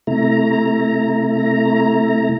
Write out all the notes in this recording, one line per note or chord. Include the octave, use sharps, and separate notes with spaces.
C3 A3 E4 A#5